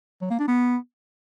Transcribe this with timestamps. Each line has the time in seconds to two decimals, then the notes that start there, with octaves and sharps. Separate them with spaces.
0.22 F#3
0.30 A#3
0.39 D4
0.48 B3